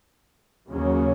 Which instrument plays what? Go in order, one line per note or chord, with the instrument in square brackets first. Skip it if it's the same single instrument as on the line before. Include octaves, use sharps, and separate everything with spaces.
[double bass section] D#2 C#3 F#3 A#3 C#4